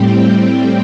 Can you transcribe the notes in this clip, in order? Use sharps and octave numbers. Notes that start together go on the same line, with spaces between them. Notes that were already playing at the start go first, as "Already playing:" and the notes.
Already playing: A2 G3 C4 G4